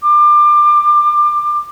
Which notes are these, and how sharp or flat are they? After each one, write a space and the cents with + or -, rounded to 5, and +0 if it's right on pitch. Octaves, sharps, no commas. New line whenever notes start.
D6 +25